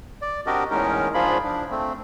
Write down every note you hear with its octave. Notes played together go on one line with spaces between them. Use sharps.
D5
C4 D4 F#4 G4 A#4 D#5
E2 A2 G#3 C#4 D#4 A#4
G#2 F3 D4 F4 G#4 B5
F3 D4
A3 C4